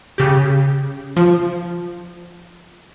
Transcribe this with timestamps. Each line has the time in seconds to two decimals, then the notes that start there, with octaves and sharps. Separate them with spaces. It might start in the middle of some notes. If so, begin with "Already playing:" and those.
0.18 C#3 G4
1.17 F3